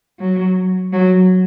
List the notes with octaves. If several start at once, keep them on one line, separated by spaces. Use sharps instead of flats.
F#3
F#3